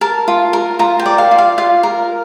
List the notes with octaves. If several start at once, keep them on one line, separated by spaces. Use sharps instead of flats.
A#4 A5
F4
A#4
F4 A#5
G5
D5
F5
F4
F5
F4 F5
A#4